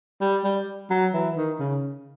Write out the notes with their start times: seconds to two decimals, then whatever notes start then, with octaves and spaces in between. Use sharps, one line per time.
0.21 G3
0.44 G3
0.90 F#3
1.14 E3
1.37 D#3
1.59 C#3